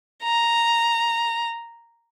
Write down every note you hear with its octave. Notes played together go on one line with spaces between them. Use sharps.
A#5